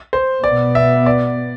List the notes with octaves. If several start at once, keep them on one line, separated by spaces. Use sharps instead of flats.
C5
B2 B3 D5
E5
D5